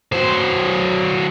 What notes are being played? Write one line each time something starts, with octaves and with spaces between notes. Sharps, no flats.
F#3 C5